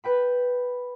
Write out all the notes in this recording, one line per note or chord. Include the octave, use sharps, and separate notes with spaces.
B4 G5 B5